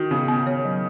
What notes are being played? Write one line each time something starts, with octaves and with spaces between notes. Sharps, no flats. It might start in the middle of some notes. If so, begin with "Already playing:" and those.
Already playing: D#3 F#4
C#3 B3
B3
C#5
F#3